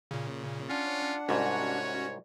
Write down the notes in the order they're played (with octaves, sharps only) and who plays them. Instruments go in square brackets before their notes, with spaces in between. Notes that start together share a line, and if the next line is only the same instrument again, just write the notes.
[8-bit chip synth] A#2 C#3
[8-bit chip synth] C#4 [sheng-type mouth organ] D4 F#5 [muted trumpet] F4
[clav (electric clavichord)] C2 G#2 [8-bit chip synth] C#4 F#4 [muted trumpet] C#5